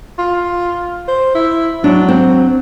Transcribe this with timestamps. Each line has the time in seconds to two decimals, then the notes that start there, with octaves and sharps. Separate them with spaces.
0.19 F4
1.08 C5
1.35 E4
1.84 F#3 D4
2.09 C4